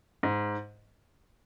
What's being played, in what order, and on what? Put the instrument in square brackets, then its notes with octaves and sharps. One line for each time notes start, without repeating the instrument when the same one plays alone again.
[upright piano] G#2